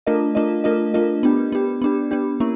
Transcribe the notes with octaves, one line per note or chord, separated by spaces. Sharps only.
A3 D4 F4 A#4 D#5
A3 D4 F4 A#4 D#5
A3 D4 F4 A#4 D#5
A3 D4 F4 A#4 D#5
B3 D4 G4
B3 D4 G4
B3 D4 G4
B3 D4 G4
A#3 C#4 E4